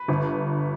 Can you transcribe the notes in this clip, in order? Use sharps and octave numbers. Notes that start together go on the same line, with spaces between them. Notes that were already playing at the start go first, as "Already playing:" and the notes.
Already playing: B4
G1